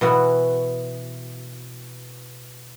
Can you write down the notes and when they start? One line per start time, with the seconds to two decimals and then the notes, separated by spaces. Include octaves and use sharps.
0.01 B2 E3 F#4